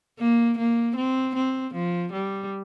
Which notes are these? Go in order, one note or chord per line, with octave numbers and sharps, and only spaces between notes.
A#3
A#3
C4
C4
F3
G3